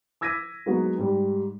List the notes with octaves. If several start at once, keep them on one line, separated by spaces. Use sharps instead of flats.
D6 E6 G#6 A#6 B6 D#7
F#3 G#3 A#3 B3 D#4 F#4
G#2 G3